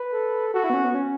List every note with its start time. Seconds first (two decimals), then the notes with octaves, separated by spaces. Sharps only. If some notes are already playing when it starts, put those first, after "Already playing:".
Already playing: B4
0.12 A4
0.53 F#4 A4
0.64 E4
0.70 B3
0.74 C#4
0.84 B3
0.94 C#4